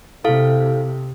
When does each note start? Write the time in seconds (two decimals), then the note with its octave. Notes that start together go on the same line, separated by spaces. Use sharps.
0.24 C3 E4 A4 F5